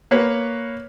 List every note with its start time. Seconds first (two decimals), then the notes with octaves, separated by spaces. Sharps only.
0.11 A#3 B4 C#5